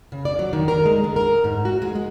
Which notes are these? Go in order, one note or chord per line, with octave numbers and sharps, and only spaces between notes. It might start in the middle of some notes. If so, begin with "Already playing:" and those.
C#3
D5
F#3
D#3
A#4
G#3
D3
A#4
G#2
F#4
G#3
G#3